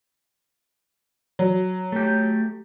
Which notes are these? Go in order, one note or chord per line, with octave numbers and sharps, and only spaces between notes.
F#3
A3 G4